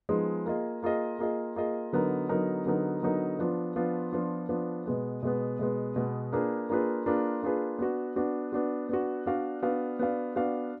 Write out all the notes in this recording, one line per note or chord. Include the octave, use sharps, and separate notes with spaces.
F3 G#3 B3 D#4 G#4
A#3 F4 G#4 D#5
A#3 F4 G#4 D#5
A#3 F4 G#4 D#5
A#3 F4 G#4 D#5
D3 F#3 B3 D#4 A#4
D3 F#3 B3 D#4 A#4
D3 F#3 B3 D#4 A#4
D3 F#3 B3 D#4 A#4
F3 B3 D4 F4
F3 B3 D4 F4
F3 B3 D4 F4
F3 B3 D4 F4
B2 G#3 B3
B2 G#3 B3
B2 G#3 B3
B2 G#3 B3
A#3 D4 F4 G#4 B4
A#3 D4 F4 G#4 B4
A#3 D4 F4 G#4 B4
A#3 D4 F4 G#4 B4
B3 D4 F#4
B3 D4 F#4
B3 D4 F#4
B3 D4 F#4
B3 D4 F#4 D5 F5
B3 D4 F#4 D5 F5
B3 D4 F#4 D5 F5
B3 D4 F#4 D5 F5